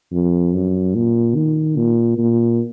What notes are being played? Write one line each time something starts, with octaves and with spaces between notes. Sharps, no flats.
F2
F#2
A#2
D#3
A#2
A#2